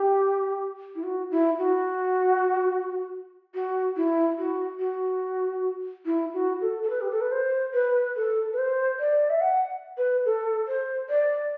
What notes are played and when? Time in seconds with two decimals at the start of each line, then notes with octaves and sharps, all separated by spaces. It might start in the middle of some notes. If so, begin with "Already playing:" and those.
Already playing: G4
0.95 E4
1.03 F#4
1.31 E4
1.58 F#4
3.54 F#4
3.96 E4
4.38 F#4
4.79 F#4
6.06 E4
6.34 F#4
6.61 A4
6.83 A4
6.90 B4
7.01 G4
7.11 A4
7.21 B4
7.31 C5
7.74 B4
8.16 A4
8.53 B4
8.58 C5
8.99 D5
9.30 E5
9.41 F#5
9.97 B4
10.25 A4
10.68 C5
11.09 D5